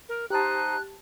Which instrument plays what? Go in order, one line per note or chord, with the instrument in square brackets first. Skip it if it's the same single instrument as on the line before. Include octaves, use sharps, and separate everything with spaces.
[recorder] A#4
[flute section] D#4 C5 A#5 [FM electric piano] G4 A5 [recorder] F#6